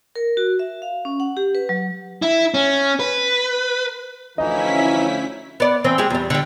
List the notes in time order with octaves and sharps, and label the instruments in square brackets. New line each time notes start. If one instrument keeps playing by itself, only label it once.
[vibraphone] A#4
F#4
E5
F5
C#4
F#5
G4
B4
F#3
[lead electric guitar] E4
C#4
B4
[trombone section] D2 F3 [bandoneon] E3 D#4 [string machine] C#4 E4 B6 [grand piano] D#5
[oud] B3 D5
E3 C4
G#3 G4 G#4
E2 G3
D3 G3